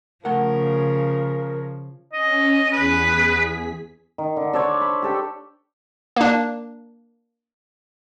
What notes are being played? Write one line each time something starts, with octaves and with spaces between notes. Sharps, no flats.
C#3 F3 A3 A#4 F#5
C#4 D#5
E2 G#4 B4 B6
D#3
D3
D4 A4 C5 C#5
B5
G4 A4 G5
A#3 D4